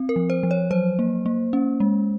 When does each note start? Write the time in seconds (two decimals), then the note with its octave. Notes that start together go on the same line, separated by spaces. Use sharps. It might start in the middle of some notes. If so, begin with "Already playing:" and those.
Already playing: C4
0.09 A#4
0.16 F3
0.30 C5
0.43 F3
0.51 C#5
0.71 F#3 C5
0.99 A#3
1.26 A#3
1.53 C#4
1.80 G#3